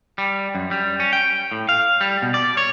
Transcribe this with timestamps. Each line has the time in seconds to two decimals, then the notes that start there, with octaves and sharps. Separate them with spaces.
0.18 G3
0.55 F#2
0.71 G3
1.00 C#4
1.13 G5
1.52 A2
1.69 F5
2.01 G3
2.22 B2
2.34 D5
2.57 C#5